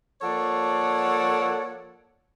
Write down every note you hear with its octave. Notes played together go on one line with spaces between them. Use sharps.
F3 A#3 A4 C#5 D5 F#5